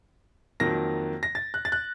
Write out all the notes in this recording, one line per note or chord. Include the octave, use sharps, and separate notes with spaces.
F2 D#3 F#3 A#3 A#6
A#6
A6
F#6
A6
F#6